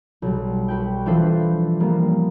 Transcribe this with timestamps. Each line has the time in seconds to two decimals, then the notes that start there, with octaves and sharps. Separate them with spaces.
0.22 B1 G3
0.68 F#4 B4 G5
1.06 E3 F3 D4 A4 B4 C5
1.80 G3 A#3 B3